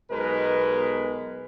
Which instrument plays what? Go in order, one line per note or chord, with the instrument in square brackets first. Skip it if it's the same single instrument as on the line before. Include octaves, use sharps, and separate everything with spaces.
[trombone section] B1 B2 G#3 A#4 B4